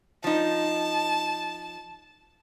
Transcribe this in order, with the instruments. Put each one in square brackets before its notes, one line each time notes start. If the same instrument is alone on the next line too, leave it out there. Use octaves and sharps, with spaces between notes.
[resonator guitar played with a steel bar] F3 D#4 [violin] A5